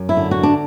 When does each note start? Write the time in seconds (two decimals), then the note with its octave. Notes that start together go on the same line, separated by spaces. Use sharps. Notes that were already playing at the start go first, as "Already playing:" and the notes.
Already playing: F#2
0.09 E4
0.17 D3
0.31 F#4
0.43 D4